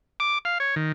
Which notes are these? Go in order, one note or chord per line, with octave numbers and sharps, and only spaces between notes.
D6
F5
C#5
D#3